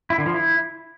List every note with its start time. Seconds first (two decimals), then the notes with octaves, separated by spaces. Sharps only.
0.10 E4
0.18 D3
0.26 F3
0.34 E4